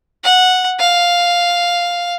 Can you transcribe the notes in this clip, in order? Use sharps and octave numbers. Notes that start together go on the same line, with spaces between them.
F#5
F5